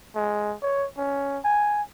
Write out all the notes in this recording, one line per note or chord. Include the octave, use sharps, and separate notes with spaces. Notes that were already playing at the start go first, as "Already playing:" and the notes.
G#3
C#5
C#4
G#5